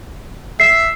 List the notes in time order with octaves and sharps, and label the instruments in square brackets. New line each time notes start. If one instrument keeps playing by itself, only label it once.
[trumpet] E5 [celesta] C7